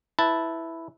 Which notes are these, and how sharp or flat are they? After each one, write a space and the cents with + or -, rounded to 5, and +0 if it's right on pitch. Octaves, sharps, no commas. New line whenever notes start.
E4 +0 B4 +0 A5 +0